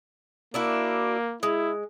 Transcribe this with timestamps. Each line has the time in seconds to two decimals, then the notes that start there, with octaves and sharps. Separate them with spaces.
0.54 A#3 D4 E4 F#4
1.43 G#3 E4